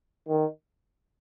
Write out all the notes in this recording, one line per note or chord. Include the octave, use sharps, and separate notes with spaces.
D#3